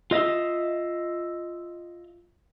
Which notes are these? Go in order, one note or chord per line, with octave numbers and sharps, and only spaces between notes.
F4 D#5 E5